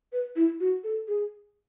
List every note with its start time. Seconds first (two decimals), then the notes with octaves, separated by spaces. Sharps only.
0.13 B4
0.36 E4
0.60 F#4
0.84 A4
1.08 G#4